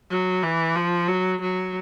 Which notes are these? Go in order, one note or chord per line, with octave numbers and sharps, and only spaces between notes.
F#3
E3
F3
F#3
F#3